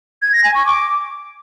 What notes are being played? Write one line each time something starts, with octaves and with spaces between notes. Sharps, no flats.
G#6
A#6
G#5
C#6
D6